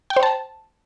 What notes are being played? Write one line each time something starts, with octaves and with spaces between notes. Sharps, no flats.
G5
C5
A5